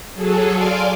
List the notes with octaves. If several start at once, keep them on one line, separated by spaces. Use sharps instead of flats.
F#3 G#4 A4
D5 F5 G#5 C6 D6